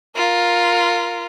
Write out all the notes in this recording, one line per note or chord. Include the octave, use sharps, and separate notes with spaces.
F4 A#4